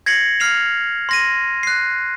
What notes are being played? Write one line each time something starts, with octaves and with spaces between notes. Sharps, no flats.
G#6 A#6 C7 C#7 F#7
F6 C7 F7
C6 A#6 D#7
F#6 C7